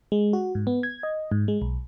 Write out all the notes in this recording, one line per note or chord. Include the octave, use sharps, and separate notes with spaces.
G#3
F#4
G#2
B3
G#6
D#5
G#2
G#3
B1